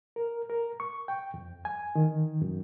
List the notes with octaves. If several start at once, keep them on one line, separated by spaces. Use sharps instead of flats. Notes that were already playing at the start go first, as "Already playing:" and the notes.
A#4
A#4
C#6
G5
F2
G#5
D#3
F#2